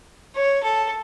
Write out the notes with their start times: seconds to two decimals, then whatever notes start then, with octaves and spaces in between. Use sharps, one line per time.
0.35 C#5
0.63 A4